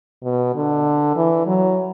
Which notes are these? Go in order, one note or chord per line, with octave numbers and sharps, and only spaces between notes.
B2
D3
E3
F#3